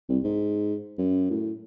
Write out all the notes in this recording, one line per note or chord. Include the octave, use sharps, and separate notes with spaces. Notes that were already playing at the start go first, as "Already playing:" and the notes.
C2
G#2
F#2
A2